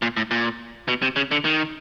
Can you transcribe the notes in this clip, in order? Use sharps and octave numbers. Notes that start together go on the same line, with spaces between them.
A#2
A2
A#2
B2
C3
C#3
D3
D#3